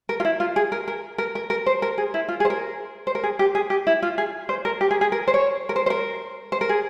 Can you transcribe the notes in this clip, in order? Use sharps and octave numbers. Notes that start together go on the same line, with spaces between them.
A#4
F4
E4
F4
G#4
A#4
A#4
A#4
A#4
A#4
C5
A#4
G#4
E4
F4
G#4
C5
A#4
C5
A#4
G#4
G4
G#4
G4
E4
F4
G#4
C5
A#4
G4
G#4
G#4
A#4
C5
C#5
A#4
C5
C5
A#4
C5
A#4
G#4